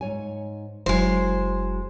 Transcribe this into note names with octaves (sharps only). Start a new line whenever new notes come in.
G#2 C#5 G#5
F#1 F#3 G#3 E4 C5